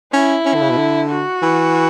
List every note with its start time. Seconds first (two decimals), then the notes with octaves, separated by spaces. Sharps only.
0.13 C#4 E4
0.46 C#4
0.54 D3
0.61 C#3
0.70 B2
0.77 D3
1.10 F#4
1.42 E3